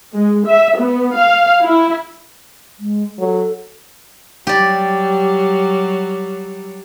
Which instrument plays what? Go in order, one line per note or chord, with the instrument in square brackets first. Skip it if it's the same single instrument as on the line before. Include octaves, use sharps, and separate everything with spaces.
[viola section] G#3
E5
B3
F5
E4
[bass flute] G#3
[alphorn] F#3 [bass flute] A4
[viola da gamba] F#3 G3 [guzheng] G4 D5